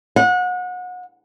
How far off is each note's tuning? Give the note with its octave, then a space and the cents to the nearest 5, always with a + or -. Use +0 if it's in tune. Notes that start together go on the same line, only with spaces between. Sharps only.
F#5 -30